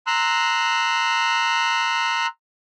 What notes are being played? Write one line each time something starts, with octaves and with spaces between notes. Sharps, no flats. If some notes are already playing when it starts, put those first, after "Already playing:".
A#5 C6 E6 F#6